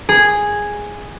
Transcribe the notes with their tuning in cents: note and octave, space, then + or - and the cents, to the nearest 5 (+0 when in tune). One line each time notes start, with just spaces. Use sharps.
G#4 -5